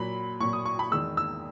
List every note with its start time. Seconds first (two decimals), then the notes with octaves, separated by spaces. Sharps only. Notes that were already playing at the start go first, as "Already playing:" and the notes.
Already playing: A#2 F#3 B5
0.40 A#2 F#3 C#6
0.53 D#6
0.66 C#6
0.79 B5
0.91 E2 D#3 G#3 E6
1.17 E6